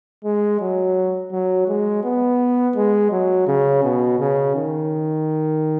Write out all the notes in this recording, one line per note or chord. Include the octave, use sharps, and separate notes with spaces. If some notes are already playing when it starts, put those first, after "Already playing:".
G#3
F#3
F#3
G#3
B3
G#3
F#3
C#3
B2
C#3
D#3